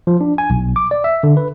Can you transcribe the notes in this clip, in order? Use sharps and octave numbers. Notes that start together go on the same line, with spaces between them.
F3
D4
G#5
B1
D6
D5
E5
D3
B4